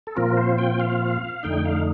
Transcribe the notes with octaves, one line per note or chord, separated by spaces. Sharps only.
A4
A#2 F3 C4 F4 A#4
C5
G5
F5
F2 D3 A3 D#4 G5
F5